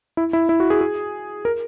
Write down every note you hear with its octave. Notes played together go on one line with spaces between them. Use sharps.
E4
E4
E4
F#4
G#4
G#4
A#4